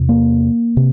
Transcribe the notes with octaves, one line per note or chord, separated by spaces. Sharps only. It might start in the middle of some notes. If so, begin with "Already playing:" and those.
Already playing: E2 C3
A#3
C3